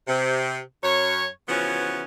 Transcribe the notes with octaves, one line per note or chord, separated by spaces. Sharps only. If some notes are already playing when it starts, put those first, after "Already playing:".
C3
F#2 C#5
C#3 E3 F3 B3 C#4 F#4